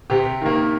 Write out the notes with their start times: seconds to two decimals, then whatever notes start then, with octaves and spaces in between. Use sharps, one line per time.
0.10 C3 G4
0.42 D#3 A#3